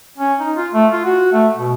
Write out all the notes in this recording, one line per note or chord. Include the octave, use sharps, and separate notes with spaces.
C#4
D#4
F4
A3
F4
F#4
A3
B2